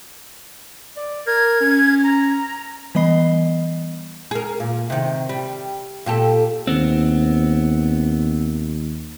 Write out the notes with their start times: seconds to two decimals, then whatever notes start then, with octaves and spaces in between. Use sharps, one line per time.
0.96 D5
1.27 A#4 G#6
1.61 C#4
2.04 A#5
2.95 E3 G3 B3 D#5 B5 C7
4.31 G#4 A#4
4.60 A#2
4.90 C3 D#3
5.29 G3
6.06 A#2 G4 A4
6.67 D#2 B3 C4